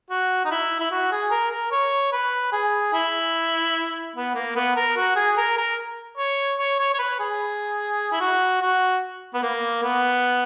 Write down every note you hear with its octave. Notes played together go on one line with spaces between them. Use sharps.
F#4
D#4
E4
E4
F#4
G#4
A#4
A#4
C#5
B4
G#4
E4
B3
A#3
B3
A#4
F#4
G#4
A#4
A#4
C#5
C#5
C#5
C#5
B4
G#4
E4
F#4
F#4
B3
A#3
B3